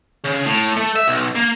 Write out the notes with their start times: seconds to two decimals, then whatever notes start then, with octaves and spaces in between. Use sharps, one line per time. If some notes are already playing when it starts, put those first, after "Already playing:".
0.24 C#3
0.45 A2
0.77 A3
0.96 E5
1.07 B1
1.35 A#3